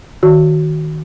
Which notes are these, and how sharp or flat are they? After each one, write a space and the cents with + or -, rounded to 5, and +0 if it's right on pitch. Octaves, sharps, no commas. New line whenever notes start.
D#3 +0 F#4 +0